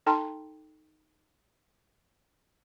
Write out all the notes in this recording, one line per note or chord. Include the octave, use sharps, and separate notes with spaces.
D#4 A4 G5 A5 A#5 C6